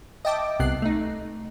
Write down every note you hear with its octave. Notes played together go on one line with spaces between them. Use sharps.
D#5 E5 G5 A5 D6
C2 C3 B3 F#6 C7
A3 D#4